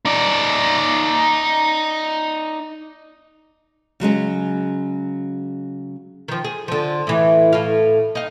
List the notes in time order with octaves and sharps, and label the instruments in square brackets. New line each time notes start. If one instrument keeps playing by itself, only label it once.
[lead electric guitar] D#4 D5
[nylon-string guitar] C#3 F#3 G#3 C#4
[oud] D#3 F3
G#4
D3 F3
A2 E3
A2 F5
D#4 F5